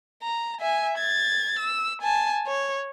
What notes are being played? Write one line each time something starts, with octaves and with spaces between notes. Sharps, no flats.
A#5
E5 G#5
G#6 A6
E6
G#5 A5
C#5